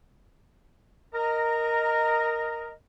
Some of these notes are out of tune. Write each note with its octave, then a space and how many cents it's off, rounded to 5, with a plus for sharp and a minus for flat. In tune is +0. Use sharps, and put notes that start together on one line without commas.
A#4 +0 D#5 +0 A#5 -15